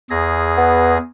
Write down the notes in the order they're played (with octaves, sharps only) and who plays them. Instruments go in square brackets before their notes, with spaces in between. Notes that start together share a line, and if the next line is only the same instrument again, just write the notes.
[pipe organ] E2 G#4 A#6
[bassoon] B3